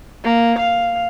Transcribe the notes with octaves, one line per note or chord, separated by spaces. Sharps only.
A#3
F5